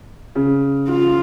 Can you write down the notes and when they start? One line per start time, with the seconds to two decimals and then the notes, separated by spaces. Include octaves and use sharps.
0.35 C#3
0.89 F4